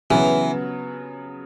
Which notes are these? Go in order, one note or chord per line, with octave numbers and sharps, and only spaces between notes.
C#3 E3 F#3 B3